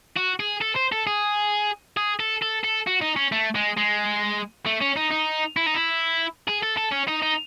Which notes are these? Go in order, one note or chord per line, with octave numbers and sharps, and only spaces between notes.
F#4
G#4
A4
C5
A4
G#4
G#4
A4
A4
A4
F#4
D#4
C#4
A3
G#3
G#3
A3
C#4
D#4
D#4
E4
D#4
E4
G#4
A4
A4
C#4
D#4
D#4